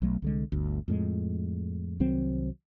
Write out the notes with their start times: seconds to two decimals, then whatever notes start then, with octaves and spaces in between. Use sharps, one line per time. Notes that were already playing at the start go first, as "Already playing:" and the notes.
0.02 B1 F#3 A3
0.22 C2 D3 G#3
0.52 G1 D2
0.88 F2 A2 G#3
2.00 C2 D#3 F#3 C4